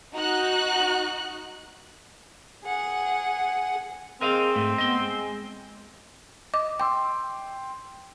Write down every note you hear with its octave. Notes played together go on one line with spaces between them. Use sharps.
D#4 F#4 F#6
G#4 F#5
C4 G#4 A#4 D#5 F5
G#2 A3
B3 D#5 C6
G#3
D#5 D6
G5 C6 D6 E6